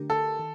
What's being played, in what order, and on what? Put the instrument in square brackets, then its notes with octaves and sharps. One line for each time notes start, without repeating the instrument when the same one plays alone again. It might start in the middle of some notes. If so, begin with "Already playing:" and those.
Already playing: [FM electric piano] D3 A3 D4 G4 A#4
[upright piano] A4
[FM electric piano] D#3